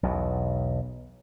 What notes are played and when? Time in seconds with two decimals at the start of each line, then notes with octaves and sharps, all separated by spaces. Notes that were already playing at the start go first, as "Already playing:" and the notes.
0.03 B1 E2 B2